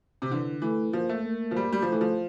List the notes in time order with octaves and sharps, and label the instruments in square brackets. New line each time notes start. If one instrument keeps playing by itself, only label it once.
[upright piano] C3
[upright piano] D3 [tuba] E3
[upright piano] E3 [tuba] A3
[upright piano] F3 [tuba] A#3
[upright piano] A3
[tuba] A#3
[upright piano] F3
G3
G3
F3
[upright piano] E3 [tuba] A3
[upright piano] F3